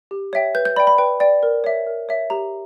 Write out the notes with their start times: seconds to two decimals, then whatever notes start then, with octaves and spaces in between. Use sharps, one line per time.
0.11 G4
0.33 C#5 E5 G5
0.55 B4 G6
0.65 G6
0.76 D5 G5 B5
0.87 B5
0.98 B4 G5
1.20 D5 G5
1.43 A#4
1.64 C#5 E5
1.87 A#4
2.09 C#5 E5
2.30 G4 A#5